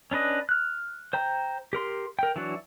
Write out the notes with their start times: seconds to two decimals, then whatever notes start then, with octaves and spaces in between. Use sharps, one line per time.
0.11 C#4 D4 B4 D#5
0.49 F6 F#6
1.13 C5 G5 A#5
1.73 G4 A#4 C6
2.19 A#4 G5
2.36 E3 F#3 D4 F#4